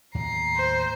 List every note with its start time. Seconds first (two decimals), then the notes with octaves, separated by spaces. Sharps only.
0.15 D#2 A2 F#3 A#5 C7
0.57 C5